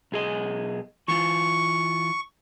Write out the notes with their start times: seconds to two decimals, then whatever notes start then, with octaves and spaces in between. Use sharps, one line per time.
0.12 B1 G#4 D#5
1.08 E3 F4 C#6